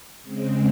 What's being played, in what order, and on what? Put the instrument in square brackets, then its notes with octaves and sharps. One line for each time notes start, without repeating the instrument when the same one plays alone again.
[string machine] C#3 G#3 C4